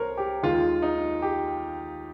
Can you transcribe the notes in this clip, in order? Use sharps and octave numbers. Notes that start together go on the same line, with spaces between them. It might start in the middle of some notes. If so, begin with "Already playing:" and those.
Already playing: C2 A#4 C5 C#5
G4
D#2 D#3 G#3 F4
D#4
G4